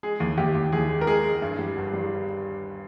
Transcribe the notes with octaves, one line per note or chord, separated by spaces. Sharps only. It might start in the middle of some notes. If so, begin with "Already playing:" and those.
G#3 G#4
D#2
D#2 G4
D#2
D#2 G#4
G#3
A#4
G#3 G#4
G#3
G2
G3
G1
G3